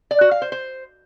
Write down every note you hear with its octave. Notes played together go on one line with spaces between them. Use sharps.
D5
F#4
F5
C5
C5